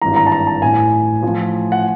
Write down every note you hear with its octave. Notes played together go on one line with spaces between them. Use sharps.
G#1 G2 E3 A#5
A#5
A5
A#5
A5
A1 A2 E3 G#5
A1 A2 F3
F#5